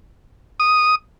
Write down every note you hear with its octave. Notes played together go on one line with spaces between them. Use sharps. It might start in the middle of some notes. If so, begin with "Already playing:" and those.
D#6